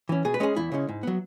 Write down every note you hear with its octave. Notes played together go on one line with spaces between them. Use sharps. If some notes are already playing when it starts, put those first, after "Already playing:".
E3 C#4
B2 G#4
B4
G#3 C#4 G#4
E2 E4
C#3 G#3 C#4
G#2
F#3 B3